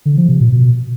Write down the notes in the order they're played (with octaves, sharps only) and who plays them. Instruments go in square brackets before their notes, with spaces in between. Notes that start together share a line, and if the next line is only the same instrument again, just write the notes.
[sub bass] D3
F3
C3
A#2
B2